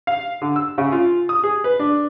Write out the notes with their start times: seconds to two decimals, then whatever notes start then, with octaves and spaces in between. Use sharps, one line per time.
0.07 F5
0.42 D3
0.56 E6
0.78 C#3
0.92 F4
1.29 D#6
1.44 G#4
1.64 B4
1.79 D4